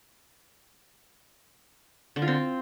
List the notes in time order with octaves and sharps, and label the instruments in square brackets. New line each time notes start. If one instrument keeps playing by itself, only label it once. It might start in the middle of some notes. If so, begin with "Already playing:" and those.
[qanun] D3
F4
C4